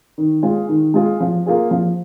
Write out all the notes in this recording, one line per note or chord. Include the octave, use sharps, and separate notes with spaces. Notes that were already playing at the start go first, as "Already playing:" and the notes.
D#3
G#3 F4 G#4
D#3
G#3 F4 G#4
F3
A#3 F4 G#4
F3